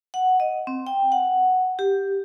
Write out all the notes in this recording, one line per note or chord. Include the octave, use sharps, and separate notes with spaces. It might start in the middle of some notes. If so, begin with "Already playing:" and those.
F#5
D#5
C4
G5
F#5
G4